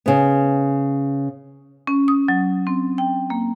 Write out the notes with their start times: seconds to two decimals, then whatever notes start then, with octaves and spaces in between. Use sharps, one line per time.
0.06 C#3 B3
1.87 C#4
2.08 D#6
2.28 F#3
2.67 C4
2.98 G5
3.30 A#3